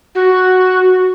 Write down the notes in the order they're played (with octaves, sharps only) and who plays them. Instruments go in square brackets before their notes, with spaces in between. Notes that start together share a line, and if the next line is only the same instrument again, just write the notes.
[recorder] F#4